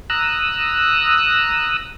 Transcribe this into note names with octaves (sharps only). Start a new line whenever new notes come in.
A#5 D#6 E6 F#6